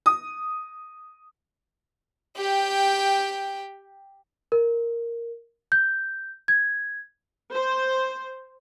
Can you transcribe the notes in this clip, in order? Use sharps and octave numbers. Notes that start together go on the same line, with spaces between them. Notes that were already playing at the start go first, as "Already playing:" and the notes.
D#6
G4 G5
A#4
G6
G#6
C5